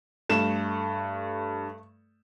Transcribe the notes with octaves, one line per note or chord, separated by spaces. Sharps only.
G2 A3 E7